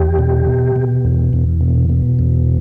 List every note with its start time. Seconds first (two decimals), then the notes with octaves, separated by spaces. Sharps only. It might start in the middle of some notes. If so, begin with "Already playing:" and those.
Already playing: E2 G4
0.19 B2
0.47 B2
0.76 B2
1.05 E2
1.33 E2
1.61 B2
1.89 B2
2.19 E2